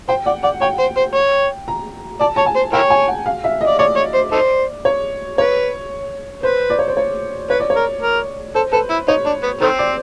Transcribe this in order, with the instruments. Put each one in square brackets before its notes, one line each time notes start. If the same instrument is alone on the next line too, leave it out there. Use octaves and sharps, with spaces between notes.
[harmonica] C5 [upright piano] G5
[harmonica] D5 [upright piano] F#5
[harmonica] D5 [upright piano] F#5
[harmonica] C#5 [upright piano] G5
[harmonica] C5
C5
C#5
[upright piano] A#5
[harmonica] D5 [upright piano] A5
[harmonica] C#5 [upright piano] A5
[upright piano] G#5
[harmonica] C5
[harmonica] E4 A#4 C#5 [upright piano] G5
[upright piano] G#5
F#5
F5
E5
D#5
[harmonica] D5
[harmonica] C#5 [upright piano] D5
[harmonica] C#5
C5
D#4 A4 C5
[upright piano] C#5
[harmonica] B4 [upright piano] C#5
[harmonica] B4 [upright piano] C5
[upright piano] D5
C#5
C5
C#5
[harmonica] B4 [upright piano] C#5
[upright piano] D5
C#5
[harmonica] A#4
A#4
[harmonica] A4 [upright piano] C5
[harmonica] A4 [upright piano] B4
[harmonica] E4
[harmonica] D#4 [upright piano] C#5
[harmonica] D4
B3
[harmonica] D#3 A3 C4 [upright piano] C5
[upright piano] D5